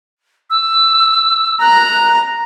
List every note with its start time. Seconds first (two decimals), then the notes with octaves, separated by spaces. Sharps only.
0.50 E6
1.61 A#5 F#6